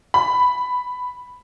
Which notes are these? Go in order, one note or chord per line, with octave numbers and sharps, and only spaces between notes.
B5